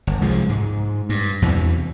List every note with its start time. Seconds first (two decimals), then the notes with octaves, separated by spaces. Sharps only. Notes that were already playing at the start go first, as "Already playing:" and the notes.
0.07 G1
0.22 C2 F3 G#3
0.49 G#2
1.09 G2
1.42 E2 C3 E3